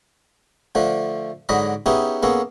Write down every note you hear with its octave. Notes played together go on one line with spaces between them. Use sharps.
D3 F3 A3 D4
G#2 D3 F#3 D4 D#5 B5
B3 C#4 D#4 E4 G4 G#4
A#3 B3 C#4 G#4 A4